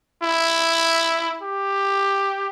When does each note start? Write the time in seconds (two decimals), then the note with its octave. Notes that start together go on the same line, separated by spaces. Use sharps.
0.23 E4
1.42 G4